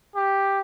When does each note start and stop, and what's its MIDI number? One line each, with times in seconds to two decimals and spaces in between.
0.15 0.61 67